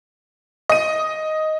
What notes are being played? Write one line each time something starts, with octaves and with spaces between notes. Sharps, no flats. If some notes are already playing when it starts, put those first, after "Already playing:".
D#5 D#7